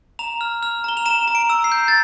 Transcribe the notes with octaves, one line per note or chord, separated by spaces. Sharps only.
A#5 F7
F6
F6
A#5 G7
F7
A#5 E7
A#5
D7
E6
C7
G6
A6